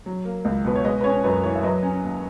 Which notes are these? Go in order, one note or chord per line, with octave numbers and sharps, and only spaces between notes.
F#3
A#3
C#2
B2 B4
C#5
G#3 B4 D#5
B4
C#4 C#5
F#2 B4
E3 C#5
E5
F#3 B4 D#5
C#4
D#2